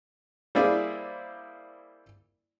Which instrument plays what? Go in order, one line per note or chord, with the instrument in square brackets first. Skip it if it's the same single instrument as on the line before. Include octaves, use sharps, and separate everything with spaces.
[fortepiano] G3 A#3 C4 E4 G#4 D5